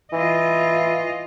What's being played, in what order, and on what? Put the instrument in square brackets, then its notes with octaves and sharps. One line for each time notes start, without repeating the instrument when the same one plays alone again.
[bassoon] E3 [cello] F4 D#5